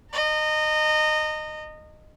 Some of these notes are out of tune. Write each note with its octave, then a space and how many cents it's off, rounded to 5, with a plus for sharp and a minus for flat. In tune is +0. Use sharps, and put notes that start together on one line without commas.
D#5 -20 A#5 -40